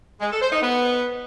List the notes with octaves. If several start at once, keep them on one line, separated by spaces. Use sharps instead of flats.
G#3
A4
C5
D#4
B3